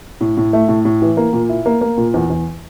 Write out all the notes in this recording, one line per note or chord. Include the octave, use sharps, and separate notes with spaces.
A2
A2
A3
A2
A2
E3
A#3
A#2
E4
A#3
A#3
A#2
E2
E2